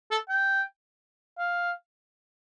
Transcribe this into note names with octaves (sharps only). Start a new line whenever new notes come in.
A4
G5
F5